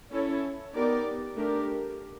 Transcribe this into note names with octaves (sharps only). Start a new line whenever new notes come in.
C#4 E4 A4 C#5
B3 D#4 G4 A#4 D5
A3 D4 G4 A#4